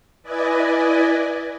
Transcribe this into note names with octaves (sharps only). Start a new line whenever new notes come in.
E4 B4 D5 D#5 G#5